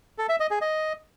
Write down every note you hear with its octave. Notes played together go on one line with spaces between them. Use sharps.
A4
E5
D#5
G#4
D#5